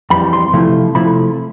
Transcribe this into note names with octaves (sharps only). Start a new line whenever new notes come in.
F2 E3 G3 B5
C6
C3 F3 A3 E4
C3 F3 A3 E4 B5